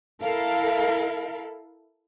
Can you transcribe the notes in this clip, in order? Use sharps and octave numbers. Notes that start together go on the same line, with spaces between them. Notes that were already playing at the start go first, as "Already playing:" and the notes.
E4 A4 A#4 F5